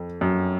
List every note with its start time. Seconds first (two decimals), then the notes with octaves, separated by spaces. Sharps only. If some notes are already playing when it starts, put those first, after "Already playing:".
Already playing: F2
0.21 F#2